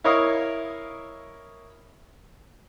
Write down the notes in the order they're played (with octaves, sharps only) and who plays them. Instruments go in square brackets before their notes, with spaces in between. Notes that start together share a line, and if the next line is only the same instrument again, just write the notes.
[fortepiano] E4 A#4 C#5 D#5 F5 D#6